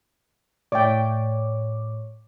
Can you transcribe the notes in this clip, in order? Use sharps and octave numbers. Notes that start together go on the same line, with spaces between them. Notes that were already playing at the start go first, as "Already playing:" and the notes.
A2 C#5 D5 E5 G5 D6